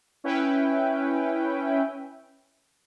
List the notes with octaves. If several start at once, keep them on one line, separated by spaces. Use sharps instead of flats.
C#4 E4 B4 G5